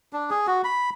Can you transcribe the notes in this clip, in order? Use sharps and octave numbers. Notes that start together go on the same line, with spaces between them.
D4
G#4
F#4
B5